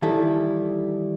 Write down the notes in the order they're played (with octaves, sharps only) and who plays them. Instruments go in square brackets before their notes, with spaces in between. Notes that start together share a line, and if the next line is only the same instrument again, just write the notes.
[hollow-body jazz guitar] D#3 E3 G3 E4 A4